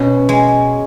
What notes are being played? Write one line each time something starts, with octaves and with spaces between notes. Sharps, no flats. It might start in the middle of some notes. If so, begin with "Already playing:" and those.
Already playing: B2 C#4
G#3